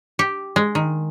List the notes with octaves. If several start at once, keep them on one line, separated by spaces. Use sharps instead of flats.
G4
G#3
D#3